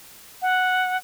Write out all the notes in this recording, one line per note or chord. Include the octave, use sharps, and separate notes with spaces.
F#5